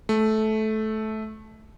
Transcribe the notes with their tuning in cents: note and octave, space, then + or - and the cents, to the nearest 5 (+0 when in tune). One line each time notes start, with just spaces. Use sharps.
A3 -15